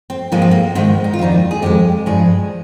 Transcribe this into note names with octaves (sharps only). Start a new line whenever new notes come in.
C4
G#2 F3 G#3 A#3
C4
A#3
G#2 D#3 G#3 C4
D#4
F4
F2 D#3 G3 D#4
G#4
F2 D#3 G#3 G4
G2 F3 G#3 G#4